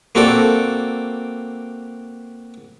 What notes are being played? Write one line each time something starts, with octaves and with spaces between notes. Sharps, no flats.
A#3 C4 F#4 A4 D5